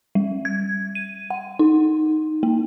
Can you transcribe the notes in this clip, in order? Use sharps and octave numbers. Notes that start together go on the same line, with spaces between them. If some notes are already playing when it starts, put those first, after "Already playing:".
G3
G#6
D#7
F#5
D#4
A#3